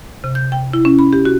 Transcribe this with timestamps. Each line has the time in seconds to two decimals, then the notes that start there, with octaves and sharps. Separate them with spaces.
0.24 C3
0.35 G6
0.52 G5
0.73 E4
0.85 C#4
0.99 B5
1.13 G4
1.25 F#4